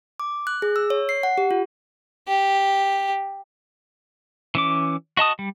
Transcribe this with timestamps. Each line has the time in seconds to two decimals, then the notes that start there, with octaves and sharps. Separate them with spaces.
0.20 D6
0.47 F#6
0.62 G#4
0.76 E6
0.90 C#5
1.09 C7
1.23 F#5
1.38 G4
1.51 F4
2.28 G4
4.55 E3 C#4 D6
5.17 F#4 D#5 A5 D#6
5.39 G3